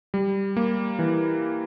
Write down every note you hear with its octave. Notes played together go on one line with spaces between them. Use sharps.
G3
A#3
E3